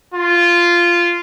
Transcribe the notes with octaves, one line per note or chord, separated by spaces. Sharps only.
F4